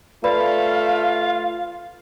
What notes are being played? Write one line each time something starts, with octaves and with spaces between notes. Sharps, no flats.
A3 F4 B4 D5 F5 B5